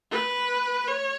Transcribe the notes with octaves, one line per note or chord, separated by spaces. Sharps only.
B4
C#5